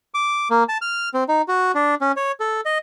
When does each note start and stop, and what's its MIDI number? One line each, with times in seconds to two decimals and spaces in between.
0.14 0.48 86
0.50 0.64 58
0.69 0.78 81
0.82 1.09 89
1.14 1.24 60
1.28 1.42 63
1.48 1.72 66
1.75 1.95 62
2.01 2.12 61
2.17 2.32 73
2.40 2.61 69
2.65 2.78 75